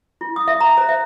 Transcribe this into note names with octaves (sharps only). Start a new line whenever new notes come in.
E4
D#6
E5
A#5
C5
E5